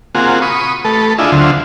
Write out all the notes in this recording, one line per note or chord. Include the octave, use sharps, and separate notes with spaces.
A#3 C4 F4 F#4 G#4
B5 C#6 D#6
A3 A4 B4
D4 E4 F4 G#4 D#5 E5
D2 D3 F#3 F4 C5 E5